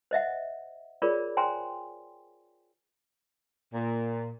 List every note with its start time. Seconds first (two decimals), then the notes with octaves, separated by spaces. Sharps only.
0.11 C5 D#5 E5 F#5
1.02 F4 G#4 A#4 C#5 D5 B5
1.37 C5 G5 G#5 A#5 C6
3.73 A#2